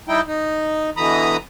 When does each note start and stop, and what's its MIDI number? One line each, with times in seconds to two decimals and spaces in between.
0.08 0.21 55
0.08 0.21 63
0.08 0.21 64
0.08 0.21 79
0.27 0.90 63
0.97 1.37 47
0.97 1.37 50
0.97 1.37 52
0.97 1.37 82
0.97 1.37 83
0.97 1.37 87